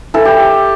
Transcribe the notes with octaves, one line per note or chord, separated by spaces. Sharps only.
E3 A4
G4